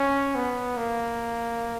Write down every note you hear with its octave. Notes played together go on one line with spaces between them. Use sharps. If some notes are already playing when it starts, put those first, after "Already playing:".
Already playing: C#4
B3
A#3